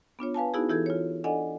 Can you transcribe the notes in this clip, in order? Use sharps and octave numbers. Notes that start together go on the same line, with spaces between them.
B3 D4 F4 C#5
B4 F5 G#5 A5
B3 D#4 E4 F#4 G#4
E3 E4 G4 A4 G#6
F4 C#5
D4 A4 D5 D#5 F#5 G#5